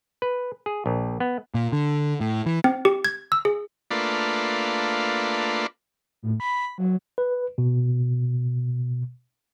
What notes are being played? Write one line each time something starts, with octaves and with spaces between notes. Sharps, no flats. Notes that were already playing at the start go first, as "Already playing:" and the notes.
B4
G#4
A#1
B3
A#2
D3
A2
E3
C4
G4
G#6
E6
G#4
A3 A#3 D4 F4 B4
A2
B5
F#3
B4
B2